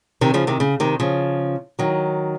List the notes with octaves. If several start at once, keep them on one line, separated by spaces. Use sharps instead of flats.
C3 D#3
C#3 F3
C3 D#3
C#3
C3 D#3
C#3 F3
D#3 F#3